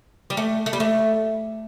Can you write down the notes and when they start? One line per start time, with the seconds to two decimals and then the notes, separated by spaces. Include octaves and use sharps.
0.30 G3
0.37 A3
0.66 A3
0.73 G3
0.80 A3